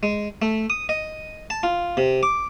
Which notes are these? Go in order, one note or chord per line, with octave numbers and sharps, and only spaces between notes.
G#3
A3
D#6
D#5
A5
F4
C3
D6